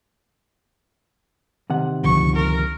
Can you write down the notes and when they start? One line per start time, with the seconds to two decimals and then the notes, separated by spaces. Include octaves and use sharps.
1.70 C3 D#3 F#5
2.04 C#2 D3 F3 C#6
2.36 A#4